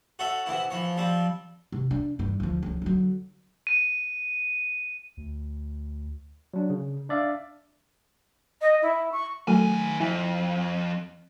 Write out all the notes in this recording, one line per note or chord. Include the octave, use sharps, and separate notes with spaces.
F#4 A4 C#5 E5
C3 E3 B3 E4
E3 F3 C#5
F3 G3 C4
C3
D4
G2 E3
D2 F3
C#2 F3
D3 F#3
D#7
D2
F#3 D4
C#3
D4 D5 E5 F5
D#5
E4
C#6
D#3 F#3 A3 G#5
F2 E4